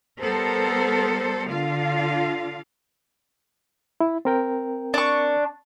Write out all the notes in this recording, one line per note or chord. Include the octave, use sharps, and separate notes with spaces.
G3 B3 A4 A#4 C5
D3 F4 F5
E4
C4 A#4 G5
D4 C#6